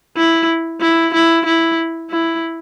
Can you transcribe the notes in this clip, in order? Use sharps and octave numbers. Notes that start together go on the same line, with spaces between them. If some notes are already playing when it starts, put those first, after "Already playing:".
E4
E4
E4
E4
E4